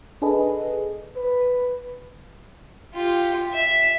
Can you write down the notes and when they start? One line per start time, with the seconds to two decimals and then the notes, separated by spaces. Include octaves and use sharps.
0.22 D4 G#4 A4 B4 D#5
1.16 B4
2.94 F4 G4
3.54 E5